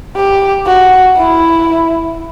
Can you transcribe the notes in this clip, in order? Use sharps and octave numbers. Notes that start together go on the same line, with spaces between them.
G4
F#4
E4